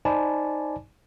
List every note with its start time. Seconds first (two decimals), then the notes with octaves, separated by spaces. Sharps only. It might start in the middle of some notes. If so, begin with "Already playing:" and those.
0.05 D#4 C5 D5 G#5 A5 B5